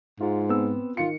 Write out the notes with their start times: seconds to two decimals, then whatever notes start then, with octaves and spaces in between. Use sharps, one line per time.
0.21 G#2 F4
0.49 B3 C4 E6
0.97 D#3 F4 C#7